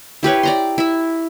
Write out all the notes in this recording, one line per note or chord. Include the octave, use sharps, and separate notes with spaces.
E4 G4 B4 C#5
D5 A#5 C6
E4 E5